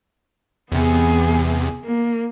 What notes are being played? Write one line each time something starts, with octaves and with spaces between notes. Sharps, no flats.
E2 C3 B3 G#4
A#3